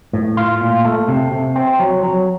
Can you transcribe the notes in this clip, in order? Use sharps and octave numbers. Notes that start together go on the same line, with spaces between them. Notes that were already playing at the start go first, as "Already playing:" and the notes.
A2
F4
A#2
A3
C3
C3
C4
F#3
F#3